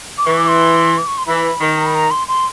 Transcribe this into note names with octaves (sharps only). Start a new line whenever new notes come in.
D6
E3 C#6
D6
C6
D6
C#6
C6
E3 B5
D#3
A#5
B5
A#5
C6
C6